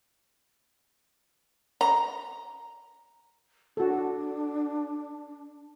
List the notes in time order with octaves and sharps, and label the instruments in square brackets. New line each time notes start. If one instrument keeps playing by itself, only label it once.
[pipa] A#5
[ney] D4 [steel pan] F#4 A4